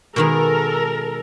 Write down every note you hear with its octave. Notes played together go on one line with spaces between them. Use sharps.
B2 D#3 G#3 A4 A#4